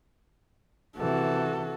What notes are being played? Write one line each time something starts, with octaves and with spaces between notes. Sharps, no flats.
C3 E3 F#4 A4